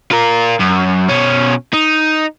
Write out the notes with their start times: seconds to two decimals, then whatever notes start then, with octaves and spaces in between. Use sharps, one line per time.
0.11 F4 A#4
0.60 F#2
1.09 B2 C#4
1.74 D#4